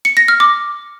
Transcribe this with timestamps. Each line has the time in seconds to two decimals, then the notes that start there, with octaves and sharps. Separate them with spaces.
0.05 C#7
0.17 A#6
0.28 F6
0.40 D6